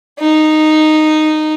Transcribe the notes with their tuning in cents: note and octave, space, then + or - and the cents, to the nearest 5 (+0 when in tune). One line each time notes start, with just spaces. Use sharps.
D#4 -10